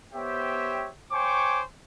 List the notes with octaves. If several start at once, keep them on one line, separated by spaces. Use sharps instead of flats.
B3 G4 C5 C#5 E5 G5
C5 C#5 G5 G#5 C#6 D6